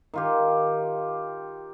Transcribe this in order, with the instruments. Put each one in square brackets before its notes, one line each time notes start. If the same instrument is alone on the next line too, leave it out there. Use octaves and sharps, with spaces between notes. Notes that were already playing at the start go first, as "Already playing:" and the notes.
[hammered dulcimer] D#3 F4 G4